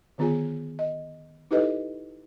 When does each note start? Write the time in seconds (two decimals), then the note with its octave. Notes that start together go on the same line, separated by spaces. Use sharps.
0.18 D3 D#3 B3 F4 G#4 G#5
0.79 D#5
1.51 D#4 E4 G4 A4 B4 D#5